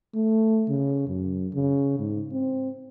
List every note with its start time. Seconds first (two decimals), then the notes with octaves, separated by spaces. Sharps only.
0.15 A3
0.69 C#3
1.08 F#2
1.54 C#3
1.99 G#2
2.32 C4